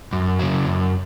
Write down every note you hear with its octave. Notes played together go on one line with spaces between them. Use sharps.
F#2
C#3 F#3
F#2